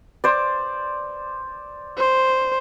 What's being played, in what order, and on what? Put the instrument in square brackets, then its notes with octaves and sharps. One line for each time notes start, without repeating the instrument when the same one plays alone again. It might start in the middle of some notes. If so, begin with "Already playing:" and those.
[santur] C5 D5
[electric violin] C5